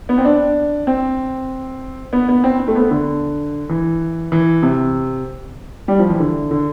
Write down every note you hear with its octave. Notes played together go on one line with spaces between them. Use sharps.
B3
C4
D4
C4
B3
B3
C4
C4
A3
B3
D3
E3
E3
C3
G3
F3
E3
D3
D3